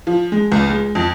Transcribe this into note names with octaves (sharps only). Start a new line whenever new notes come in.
F3
G#3
C#2
G#3
F2